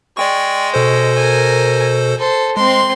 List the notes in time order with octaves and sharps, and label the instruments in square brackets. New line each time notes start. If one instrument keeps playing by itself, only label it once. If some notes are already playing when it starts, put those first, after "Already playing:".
[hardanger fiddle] G#3 [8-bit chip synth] D5 G5 C#6
[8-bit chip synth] B2 A4 C5
[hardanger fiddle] A#4 G#5
A4 C5
[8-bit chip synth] G#3 [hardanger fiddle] C4 C6